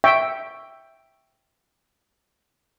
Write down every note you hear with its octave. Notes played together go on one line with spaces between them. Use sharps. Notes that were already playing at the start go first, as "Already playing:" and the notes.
E5 G5 C#6